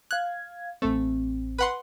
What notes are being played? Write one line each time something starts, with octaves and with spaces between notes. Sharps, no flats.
F5 F#6 G#6
A1 A3 C4
B4 F#5 C6